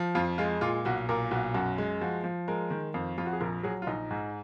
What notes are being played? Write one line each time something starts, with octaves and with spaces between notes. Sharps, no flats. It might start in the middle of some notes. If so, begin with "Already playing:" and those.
Already playing: F3
F2 F4
G#3 F4
A#2 F4
B1 F#4
A#2 A#4
B1 F#4
F#2 F#4
G#3
F3 F#4
F3
G#3 A#4
D#3
F2
F2 F4
F#4
G#4
A#1 A#4
F#3 G#4
F4
A#1 D#4
G#2